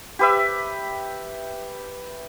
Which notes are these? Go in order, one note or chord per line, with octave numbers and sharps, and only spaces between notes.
G4 B4 E5